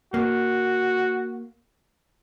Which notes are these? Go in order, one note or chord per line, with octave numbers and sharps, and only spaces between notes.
A#3 F#4